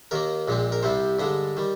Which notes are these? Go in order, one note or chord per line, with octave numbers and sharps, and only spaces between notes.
D#2 D#3 A#3 A#4
A#1 A#2 G#3 C4
A#4
C2 C3 G3 C4 C5
G2 D3 G#3 D#5
D#3 G3